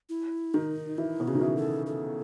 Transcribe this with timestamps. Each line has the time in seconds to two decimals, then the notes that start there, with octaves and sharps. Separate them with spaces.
0.09 E4
0.54 D#3 D#4
0.98 E3 E4
1.20 B2
1.27 C#3 F#4
1.35 D#3
1.41 E3
1.57 A4
1.86 A4